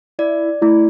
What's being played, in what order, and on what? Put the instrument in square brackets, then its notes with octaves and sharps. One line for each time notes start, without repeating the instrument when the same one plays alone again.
[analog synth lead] E4 [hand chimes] D5
[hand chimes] A3 [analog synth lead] E4